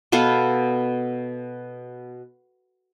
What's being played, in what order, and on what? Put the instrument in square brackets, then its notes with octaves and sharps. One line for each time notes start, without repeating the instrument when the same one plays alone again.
[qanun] B2 B3 A4 F5